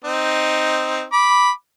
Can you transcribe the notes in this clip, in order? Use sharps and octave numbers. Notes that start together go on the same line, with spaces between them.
C4 D#4
B5 D6